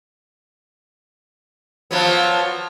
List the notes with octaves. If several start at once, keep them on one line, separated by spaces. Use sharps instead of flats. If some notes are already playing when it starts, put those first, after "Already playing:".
F3 F#3 B3